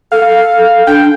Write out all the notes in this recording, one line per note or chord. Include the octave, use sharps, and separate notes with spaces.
A4 F5
D4 G5